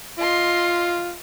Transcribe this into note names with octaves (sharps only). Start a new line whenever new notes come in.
F4 D#5 C6